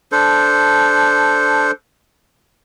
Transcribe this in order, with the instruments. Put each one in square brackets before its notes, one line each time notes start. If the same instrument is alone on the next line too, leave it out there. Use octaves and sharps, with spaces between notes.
[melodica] D4 A4 C5